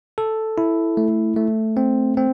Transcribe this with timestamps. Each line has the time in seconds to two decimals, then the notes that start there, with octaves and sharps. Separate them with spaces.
0.18 A4
0.58 E4
0.97 A3
1.37 A3
1.77 C4
2.17 C4